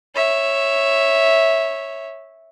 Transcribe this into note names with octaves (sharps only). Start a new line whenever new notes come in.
C#5 E5